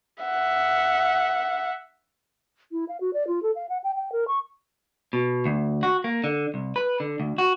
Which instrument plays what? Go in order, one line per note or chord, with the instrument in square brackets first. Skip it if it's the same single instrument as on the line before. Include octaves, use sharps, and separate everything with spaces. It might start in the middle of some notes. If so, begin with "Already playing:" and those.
[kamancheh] E5 F#5
[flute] E4
F5
F#4
D5
F4
A4
F5
F#5
G5
G5
A#4
C#6
[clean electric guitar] B2
D2
F#4
A#3
D3
C2
B4
D3
D2
F#4